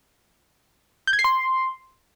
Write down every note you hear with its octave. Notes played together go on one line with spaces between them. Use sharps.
G6
G#6
C7
C6